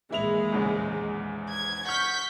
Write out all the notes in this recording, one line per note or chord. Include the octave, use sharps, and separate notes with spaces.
A#1 D#2 E3 G#3 E4 F7
E2 G#2 C#3
G#6
F#5 C#6 F6 G6 B6